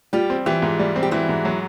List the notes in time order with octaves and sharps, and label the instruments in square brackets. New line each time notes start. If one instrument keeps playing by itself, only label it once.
[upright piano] G3 [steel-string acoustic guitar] F4 G4
[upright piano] C4
[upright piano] E3 [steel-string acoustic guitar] F4 G4
[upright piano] G#2
G3
C4
[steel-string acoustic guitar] G4
[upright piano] E3 [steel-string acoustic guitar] E4 F#4
[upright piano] G#2
F#3